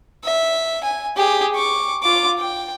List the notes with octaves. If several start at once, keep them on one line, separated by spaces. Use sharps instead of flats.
E5
G#5
G4 G#4
C#6 D6
F4 D6
G5